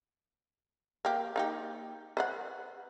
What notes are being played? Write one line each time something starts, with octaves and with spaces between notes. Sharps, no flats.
A#3 G4
A#3 D#4 G4
B4 C5 F#5